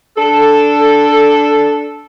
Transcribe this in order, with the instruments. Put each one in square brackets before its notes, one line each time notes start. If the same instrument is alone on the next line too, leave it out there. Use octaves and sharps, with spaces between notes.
[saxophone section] D4 A4